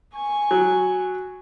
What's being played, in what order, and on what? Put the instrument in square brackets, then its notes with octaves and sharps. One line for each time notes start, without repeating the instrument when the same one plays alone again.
[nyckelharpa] G#5 C#6
[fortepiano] F#3